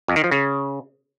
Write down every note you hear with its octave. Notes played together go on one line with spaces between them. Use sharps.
F2
D#3
F3
C#3